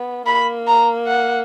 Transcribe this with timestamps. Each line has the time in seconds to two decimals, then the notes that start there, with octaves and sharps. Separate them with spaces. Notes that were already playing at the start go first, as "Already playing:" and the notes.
Already playing: B3
0.26 A#3 B5
0.67 A#5
1.07 F#5